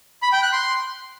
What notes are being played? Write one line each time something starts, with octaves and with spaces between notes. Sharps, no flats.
B5
G5
F#6
C6